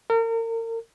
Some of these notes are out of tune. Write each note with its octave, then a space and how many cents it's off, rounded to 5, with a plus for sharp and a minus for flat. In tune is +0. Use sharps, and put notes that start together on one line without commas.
A#4 -35